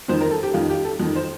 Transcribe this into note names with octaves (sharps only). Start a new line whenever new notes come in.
F2 D#3 C5
A#4
A4
G4
F2 D#3 F4
G4
A4
F2 D#3
C5